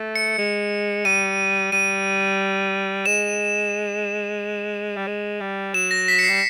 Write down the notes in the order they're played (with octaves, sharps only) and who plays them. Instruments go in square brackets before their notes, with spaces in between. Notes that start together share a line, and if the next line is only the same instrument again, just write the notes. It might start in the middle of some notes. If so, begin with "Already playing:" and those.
Already playing: [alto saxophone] A3
[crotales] C#7
[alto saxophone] G#3
[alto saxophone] G3 [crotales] D#7
[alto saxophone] G3 [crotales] D#7
[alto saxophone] G#3 [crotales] E7
[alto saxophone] G3
G#3
G3
[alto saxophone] F#3 [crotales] E7
[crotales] A#6
B6
C#7
[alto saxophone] G3 [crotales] C7